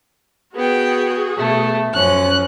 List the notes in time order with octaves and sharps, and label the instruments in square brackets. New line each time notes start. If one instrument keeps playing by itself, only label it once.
[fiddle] B3 G5 [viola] F#4 G#4
[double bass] B2 [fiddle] A3
[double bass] F#2 C#4 [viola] F3 [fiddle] F#6